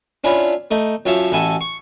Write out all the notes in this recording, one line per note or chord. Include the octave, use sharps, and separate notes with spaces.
C#4 D4 E4 F4 C#5 B5
A3 D#4
F#2 F4 C#5 E5 A5
A1 E4 F#4 A4 G#5 A5
C#6